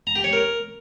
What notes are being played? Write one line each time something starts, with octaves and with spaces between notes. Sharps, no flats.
A#5
G4
C#5
A#4